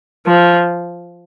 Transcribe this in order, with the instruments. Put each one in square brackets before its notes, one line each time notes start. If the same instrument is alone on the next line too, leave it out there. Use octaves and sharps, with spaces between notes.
[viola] F3